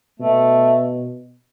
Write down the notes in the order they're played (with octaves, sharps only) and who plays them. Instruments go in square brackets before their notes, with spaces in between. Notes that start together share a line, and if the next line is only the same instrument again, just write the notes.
[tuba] B2 [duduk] A3